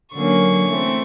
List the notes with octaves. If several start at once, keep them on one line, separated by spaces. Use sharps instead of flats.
D3 F#3 A#3 C#4 C#6
E3 A3 C4